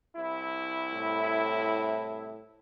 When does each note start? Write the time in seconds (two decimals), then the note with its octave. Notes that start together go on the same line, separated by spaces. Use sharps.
0.16 C2 E4
0.94 A2